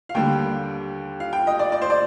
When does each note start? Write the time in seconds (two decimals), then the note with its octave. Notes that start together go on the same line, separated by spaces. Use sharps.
0.09 F5
0.14 D#2 D3 G3 A#3 G5
1.20 F5
1.33 G5
1.47 D#5
1.59 D5
1.72 D5
1.82 C5
1.90 D5